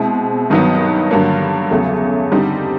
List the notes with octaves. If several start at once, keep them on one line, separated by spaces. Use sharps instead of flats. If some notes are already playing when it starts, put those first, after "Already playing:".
Already playing: B2 G#3 C4 E4
G2 D#3 F#3 B3
G2 D3 F#3 A#3
E2 C#3 F#3 A3
D3 G3 C4 D#4